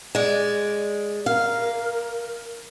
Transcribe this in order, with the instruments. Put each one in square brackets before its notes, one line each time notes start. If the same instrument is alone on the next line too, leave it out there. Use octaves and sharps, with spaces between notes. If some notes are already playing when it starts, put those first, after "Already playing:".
[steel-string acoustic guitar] G#3 D5
[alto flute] A#4 [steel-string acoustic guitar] F5